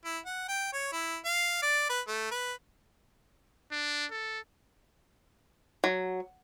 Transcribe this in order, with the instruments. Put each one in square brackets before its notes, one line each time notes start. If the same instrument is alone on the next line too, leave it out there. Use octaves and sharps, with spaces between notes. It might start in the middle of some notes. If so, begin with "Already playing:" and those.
[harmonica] E4
F#5
G5
C#5
E4
F5
D5
B4
A3
B4
[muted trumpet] D4
A4
[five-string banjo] F#3